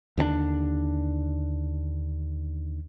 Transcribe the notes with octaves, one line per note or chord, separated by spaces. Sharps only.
D#2 D3 C4 D4